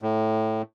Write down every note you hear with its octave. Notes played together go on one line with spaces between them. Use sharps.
A2